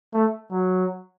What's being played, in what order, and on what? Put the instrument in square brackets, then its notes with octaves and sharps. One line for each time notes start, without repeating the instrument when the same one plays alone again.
[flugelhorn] A3
F#3